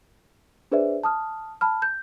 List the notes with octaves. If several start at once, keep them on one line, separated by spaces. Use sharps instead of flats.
D4 G#4 B4 C5 D5 E5
A5 D#6 F6
A5 B5 F6
G6